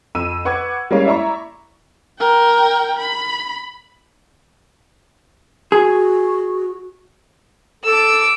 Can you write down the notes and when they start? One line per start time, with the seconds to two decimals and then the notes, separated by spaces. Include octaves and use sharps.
0.15 F2 E6 D#7
0.45 B4 F#5 C#6 D6 G#6
0.91 G3 G#3 A#3 C#4 C#5 F5
1.05 E4 D5 E5 A#5 C#6
2.19 A#4 G5
2.99 B5
5.72 F#4 G#4
7.84 A4 D6 E6